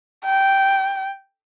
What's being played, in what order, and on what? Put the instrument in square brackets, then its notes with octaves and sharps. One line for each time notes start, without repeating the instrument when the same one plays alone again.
[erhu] G5